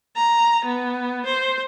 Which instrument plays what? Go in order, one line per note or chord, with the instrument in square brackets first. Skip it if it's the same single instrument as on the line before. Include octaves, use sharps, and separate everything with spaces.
[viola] A#5
B3
C5